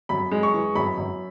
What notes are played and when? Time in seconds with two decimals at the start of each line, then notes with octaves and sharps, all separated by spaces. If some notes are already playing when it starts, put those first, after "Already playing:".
0.09 F#2 B5
0.31 G#3
0.43 C#6
0.54 E3
0.75 F#2 B5
0.98 F#2